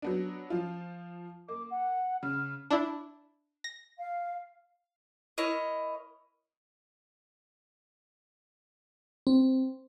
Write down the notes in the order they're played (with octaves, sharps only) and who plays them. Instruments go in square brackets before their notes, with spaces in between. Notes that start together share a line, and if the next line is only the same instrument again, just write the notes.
[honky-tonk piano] F#3 B3 D4
F3 F4
[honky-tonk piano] A#3 [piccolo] D6
[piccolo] F#5
[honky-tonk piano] C#3 [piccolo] F6
[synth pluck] D4 E4
A#6
[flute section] F5
[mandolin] E4 A#4 C#5 D#5
[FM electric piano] C4